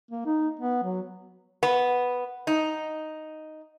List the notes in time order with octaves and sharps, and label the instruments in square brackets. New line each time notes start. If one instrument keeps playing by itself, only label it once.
[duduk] A#3
D#4
B3
F#3
[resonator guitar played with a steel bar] B3
D#4